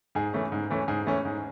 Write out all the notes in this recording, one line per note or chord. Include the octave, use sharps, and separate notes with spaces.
G#2 G#4
E3 A3 C#4
G#2
E3 A3 C#4
G#2 G#4
E3 A3 C#4
G#2